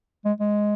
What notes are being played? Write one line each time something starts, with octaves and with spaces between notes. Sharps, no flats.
G#3
G#3